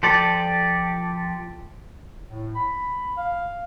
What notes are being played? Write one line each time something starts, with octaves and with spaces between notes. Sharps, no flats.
F3 G4 A4 D5
A2
B5
F5